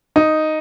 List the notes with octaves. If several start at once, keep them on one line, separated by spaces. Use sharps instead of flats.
D#4